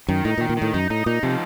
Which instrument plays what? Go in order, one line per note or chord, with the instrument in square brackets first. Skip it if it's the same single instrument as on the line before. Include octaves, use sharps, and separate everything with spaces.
[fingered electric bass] F#2 [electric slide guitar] D#3
[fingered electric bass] A2 [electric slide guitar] D#4
[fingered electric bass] A#2
[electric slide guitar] D#3
[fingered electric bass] A#2
[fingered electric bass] A2 [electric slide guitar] D#3
[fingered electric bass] F#2 [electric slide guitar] D#4
[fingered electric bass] A2 [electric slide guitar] D#4
[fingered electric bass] A#2 [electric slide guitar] D#4
[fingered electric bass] C3 [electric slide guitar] F3